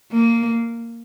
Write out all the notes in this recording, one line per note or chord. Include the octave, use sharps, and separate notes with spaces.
A#3